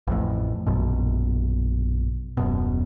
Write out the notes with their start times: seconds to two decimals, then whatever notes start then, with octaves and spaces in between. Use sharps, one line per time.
0.07 A1 F2 A2
0.67 A#1 F#2 B2
2.37 D#1 F#2 B2